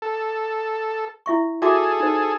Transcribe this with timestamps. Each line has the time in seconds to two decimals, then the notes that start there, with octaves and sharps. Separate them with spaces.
0.02 A4
1.26 E4 E5 C#6
1.62 F#4 G#4 A4 E5 D6
2.00 D#4 C5